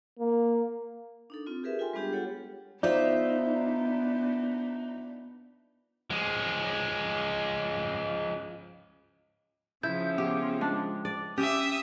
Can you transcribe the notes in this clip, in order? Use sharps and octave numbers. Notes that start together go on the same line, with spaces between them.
A#3
D4 D#4 A4
C4 F4
G4 G#4 A#4 B4 E5
F4 A4 G5 G#5 C6
G3 G#3 B3 D4 G4 G#4
F4 G4 A4 C#5 F#5
B3 D4 D#4 F4 C5 D5 E5
F3 G#3
C#3 F3 E4 G6
B3 G4
G#3 D4
D5
C#4 G4 E5 D#6